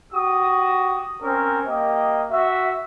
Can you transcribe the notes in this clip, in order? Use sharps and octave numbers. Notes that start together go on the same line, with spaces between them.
F#4 G4 D#6
C4 C#4 A#4
A#3 G4 D#5
F#4 E5